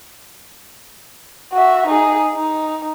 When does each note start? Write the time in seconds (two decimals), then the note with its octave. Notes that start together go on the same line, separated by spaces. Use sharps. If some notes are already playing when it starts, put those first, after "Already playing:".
1.53 F#4 E5
1.87 D#4 G#4
2.34 D#4